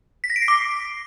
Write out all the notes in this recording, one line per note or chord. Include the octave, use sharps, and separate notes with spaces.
B6
A#6
D7
C7
D6